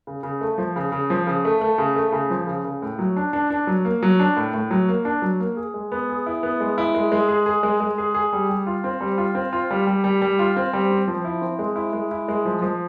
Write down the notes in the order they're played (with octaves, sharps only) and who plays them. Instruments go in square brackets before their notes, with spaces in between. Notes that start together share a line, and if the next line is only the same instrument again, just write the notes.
[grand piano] C#3
C#3
A3
F3
C#3
C#3
F3
C#3
A3
A3
C#3
A3
C#3
F3
C#3
C#3
A2
F#3
D4
D4
D4
F#3
A#3
F#3
D4
A2
A2
F#3
A#3
D4
F#3
A#3
G#4
G#3
B3
G#4
E4
B3
G#3
E4
G#3
G#3
G#4
G#4
G#3
G#3
G#4
G#4
G3
G3
F4
C4
G3
F4
C4
F4
G3
G3
G3
G3
F4
C4
G3
C4
F3
E4
C4
G#3
E4
G#3
E4
G#3
F3
F3